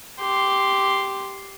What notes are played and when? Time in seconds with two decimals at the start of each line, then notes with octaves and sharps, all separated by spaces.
0.20 G4 C6